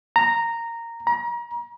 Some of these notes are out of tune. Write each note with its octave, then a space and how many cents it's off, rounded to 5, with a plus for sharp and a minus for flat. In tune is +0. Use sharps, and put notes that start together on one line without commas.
A#5 -10
A#5 +35